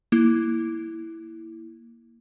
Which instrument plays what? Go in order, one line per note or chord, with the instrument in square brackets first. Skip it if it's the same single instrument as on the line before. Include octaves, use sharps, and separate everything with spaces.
[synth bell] A#3 E4